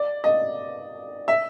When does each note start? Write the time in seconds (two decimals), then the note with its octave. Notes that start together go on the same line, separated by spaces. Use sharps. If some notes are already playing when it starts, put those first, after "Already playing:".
Already playing: D5
0.24 D#5
1.28 E5